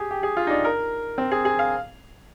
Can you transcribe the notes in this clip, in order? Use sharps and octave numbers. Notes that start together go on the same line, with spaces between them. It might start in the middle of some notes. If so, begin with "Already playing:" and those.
Already playing: G4 G#4
G4
G#4
F4
D#4
D4
A#4
C4
G#4
G#4
F5